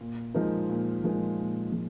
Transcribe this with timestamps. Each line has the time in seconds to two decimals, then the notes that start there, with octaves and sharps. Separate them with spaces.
0.01 A#2
0.34 F3 G#3 D#4 A#4
0.69 A#2
1.04 F3 G#3 D#4 A#4
1.38 A#2
1.72 F3 G#3